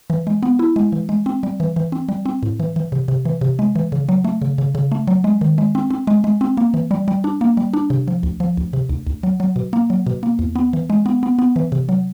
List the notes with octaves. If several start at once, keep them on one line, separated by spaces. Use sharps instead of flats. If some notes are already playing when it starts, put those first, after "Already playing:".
E3
G#3
B3
E4
G#3
E3
G#3
C4
G3
E3
E3
C4
G3
C4
A2
E3
E3
C3
C3
E3
C3
G#3
E3
C#3
F#3
A3
C#3
C#3
C#3
A3
F#3
G#3
D#3
G#3
C4
C4
G#3
G#3
C4
A#3
E3
G3
G3
D4
A#3
G3
D4
C3
F3
D2
F3
D2
C3
D2
D2
F#3
F#3
B2
A#3
F#3
B2
A#3
E2
B3
E3
G#3
B3
B3
B3
E3
C3
F#3